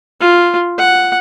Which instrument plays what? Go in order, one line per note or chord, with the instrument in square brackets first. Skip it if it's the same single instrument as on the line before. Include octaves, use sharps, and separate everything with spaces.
[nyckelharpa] F4
F#5